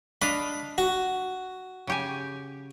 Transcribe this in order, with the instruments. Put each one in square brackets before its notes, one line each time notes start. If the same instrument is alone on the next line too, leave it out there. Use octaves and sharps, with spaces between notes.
[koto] D4 D#5 F5 [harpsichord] B5
[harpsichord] F#4
[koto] C#3 G4 G#5